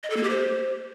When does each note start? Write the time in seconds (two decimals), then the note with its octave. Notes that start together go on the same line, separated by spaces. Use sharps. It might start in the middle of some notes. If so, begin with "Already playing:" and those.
0.03 D#5
0.10 A4
0.17 A#3
0.23 G4
0.30 C5